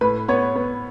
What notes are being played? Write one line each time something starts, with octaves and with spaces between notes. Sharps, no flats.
A2 B4
B3 C#5
B3